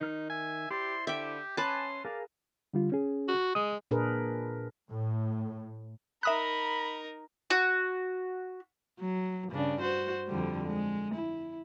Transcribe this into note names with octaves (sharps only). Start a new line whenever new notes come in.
D#3 D#4 F6
E5 G#5
E4 G4 C5 D5 C6
D3 G4 E5 G5
C#4 B4 G#5 A5 C6 D6
G#4 A#4 D5 F5
D3 G3 F4
C#4 G#4
F#4
G#3 D#6
A#2 D4 G#4 A#4 B4
A2
D#4 A#4 E5 B5 D#6 F#6
F#4
F#3
G2 C#3 D4
F#4 C5
F2 D3 G3
G#3
E4